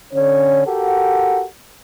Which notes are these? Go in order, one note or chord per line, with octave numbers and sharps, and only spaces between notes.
D3 C#4 C#5
F#4 G4 A4 A#4 F#5